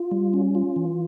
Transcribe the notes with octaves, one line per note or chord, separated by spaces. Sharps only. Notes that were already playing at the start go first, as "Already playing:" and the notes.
Already playing: F4
G3
C#4
F4
E3